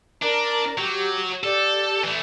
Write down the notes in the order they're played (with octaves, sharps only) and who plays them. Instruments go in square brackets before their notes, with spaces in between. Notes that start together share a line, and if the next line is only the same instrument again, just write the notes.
[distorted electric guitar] D4 [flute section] A#4 D5 A#5
[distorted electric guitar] F#3 [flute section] G4
[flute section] G4 D5 [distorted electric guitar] A4
[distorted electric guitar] E3 A3